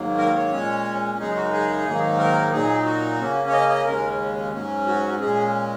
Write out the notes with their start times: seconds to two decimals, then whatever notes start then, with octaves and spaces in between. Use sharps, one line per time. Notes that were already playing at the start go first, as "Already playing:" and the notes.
Already playing: G#2 D#3 F#3 A#3
0.18 A#4
0.36 C#5
0.51 A#2 G#3 C#4
1.18 F#2 C#3 G#3 D#4 G#4
1.36 F#4
1.53 G#4
1.86 G#2 D#3 F#3 A#3 D#4
2.18 A#4
2.52 A#2 F#3 D#4 G#4
2.85 F#4
3.20 C#3 A#3 C#4
3.49 C#5
3.53 D#5
3.70 D#5
3.86 D#2 C#3 G#3 C#4 A#4
4.53 G#2 F#3 C#4
4.87 F#4
5.20 A#2 G#3 C#4 G#4